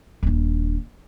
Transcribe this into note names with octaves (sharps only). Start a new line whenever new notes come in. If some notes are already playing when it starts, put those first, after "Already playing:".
D#1 D4